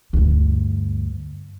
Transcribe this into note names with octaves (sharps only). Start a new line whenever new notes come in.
D2 G2